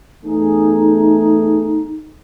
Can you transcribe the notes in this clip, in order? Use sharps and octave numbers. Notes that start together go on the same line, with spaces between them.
E2 A3 D#4 G#4